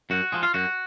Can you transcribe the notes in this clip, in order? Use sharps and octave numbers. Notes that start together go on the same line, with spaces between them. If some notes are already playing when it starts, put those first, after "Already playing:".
F#2 F#4
F3 G#3
F4
F#2 F#4